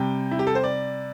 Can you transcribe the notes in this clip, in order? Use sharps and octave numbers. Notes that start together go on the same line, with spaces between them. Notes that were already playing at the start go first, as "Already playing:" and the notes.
Already playing: C3 G3 G5
E4
G4
A4
C5
D5